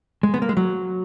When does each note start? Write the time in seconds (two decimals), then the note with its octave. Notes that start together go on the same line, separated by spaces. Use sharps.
0.23 G#3
0.34 B3
0.42 A#3
0.49 G#3
0.57 F#3